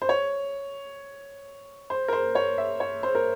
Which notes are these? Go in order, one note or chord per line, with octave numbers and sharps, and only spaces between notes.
C5
C#5
C5
A#4
C5
C#5
E5
C#5
C5
A#4